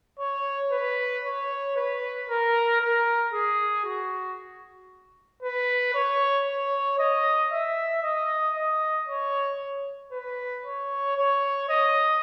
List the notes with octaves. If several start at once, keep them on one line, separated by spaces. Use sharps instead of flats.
C#5
B4
C#5
B4
A#4
A#4
G#4
F#4
B4
C#5
C#5
D#5
E5
D#5
D#5
C#5
B4
C#5
C#5
D#5